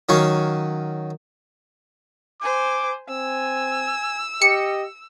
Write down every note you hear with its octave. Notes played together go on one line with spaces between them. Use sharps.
D#3 F#3 C#4 F5 C#6
C5 G#5 D6
C4 G#5 E6
G4 D#5 C#7